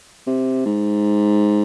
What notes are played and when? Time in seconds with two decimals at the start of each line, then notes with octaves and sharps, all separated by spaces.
0.27 C3
0.66 G#2